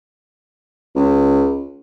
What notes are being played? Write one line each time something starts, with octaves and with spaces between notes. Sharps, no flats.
C#2